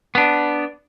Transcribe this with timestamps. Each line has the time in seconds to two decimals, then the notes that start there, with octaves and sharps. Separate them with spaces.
0.15 B3 D4